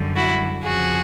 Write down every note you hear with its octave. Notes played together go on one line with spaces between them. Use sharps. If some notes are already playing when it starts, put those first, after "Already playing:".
Already playing: F#2 D3 G3
E4 F#4
F2 C#3 F3 F#4 G#4